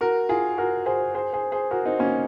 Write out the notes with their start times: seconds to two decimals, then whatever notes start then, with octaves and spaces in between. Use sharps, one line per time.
0.01 F#4 A#4
0.29 F4 G#4
0.58 F#4 A#4
0.86 G#4 C5
1.15 G#4 C5
1.33 G#4 C5
1.52 G#4 C5
1.71 F#4 A#4
1.85 C4 D#4
1.99 A#3 C#4